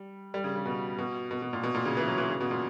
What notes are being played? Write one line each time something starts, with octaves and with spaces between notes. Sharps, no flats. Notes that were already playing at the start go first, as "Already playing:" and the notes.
Already playing: G3
G3
C#3
C#3
B2
B2
B2
B2
A#2
B2
A#2
C#3
E3
F#3
E3
C#3
B2
A#2